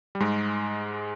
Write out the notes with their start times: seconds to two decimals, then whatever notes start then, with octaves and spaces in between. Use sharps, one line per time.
0.15 G3
0.20 G#2 G#3